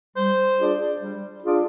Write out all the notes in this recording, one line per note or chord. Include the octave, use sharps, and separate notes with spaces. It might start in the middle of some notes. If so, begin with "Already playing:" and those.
G3 C5
D4 F4 G#4 D5
G3
D4 F4 G#4 D5